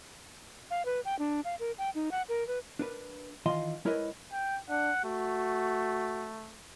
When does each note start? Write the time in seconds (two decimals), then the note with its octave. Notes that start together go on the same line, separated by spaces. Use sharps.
0.71 F5
0.85 B4
1.05 G5
1.19 D4
1.45 F5
1.60 A#4
1.78 G5
1.95 D#4
2.12 F#5
2.29 A#4
2.48 B4
2.79 D4 A#4 B4
3.46 D#3 E3 F4 D#5 F5 C6
3.85 G#3 E4 A#4 B4 C#5 D#5
4.32 G5
4.69 D4 F#5
5.04 A3 F#4